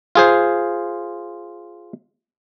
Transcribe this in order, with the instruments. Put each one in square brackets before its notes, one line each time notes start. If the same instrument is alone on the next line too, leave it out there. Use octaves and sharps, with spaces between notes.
[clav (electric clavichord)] F4 G#4 C5